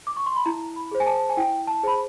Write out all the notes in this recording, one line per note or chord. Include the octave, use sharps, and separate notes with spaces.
D6
C#6
C6
B5
E4 A#5
B5
G#4 C5
G#5
A5
G#5
E4 G5
A5
G#4 C5 B5